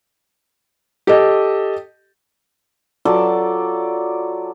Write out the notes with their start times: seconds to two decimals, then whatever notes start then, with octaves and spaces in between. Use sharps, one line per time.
1.07 G4 A4 D#5
3.05 F#3 F4 A4 D5